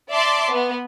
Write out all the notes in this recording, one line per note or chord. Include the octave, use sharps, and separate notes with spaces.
D5 E5 A5 C6 D6
B3